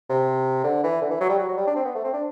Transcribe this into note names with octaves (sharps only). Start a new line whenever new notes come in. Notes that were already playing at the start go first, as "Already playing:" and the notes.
C3
D3
E3
D3
E3
F#3
G3
F#3
F#3
G3
D4
C4
B3
A3
C4
D4